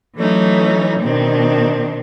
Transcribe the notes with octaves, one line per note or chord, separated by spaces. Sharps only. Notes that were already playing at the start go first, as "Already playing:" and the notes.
E3 F#3 A3 C#4 D#4
B2 D#3 C4 D4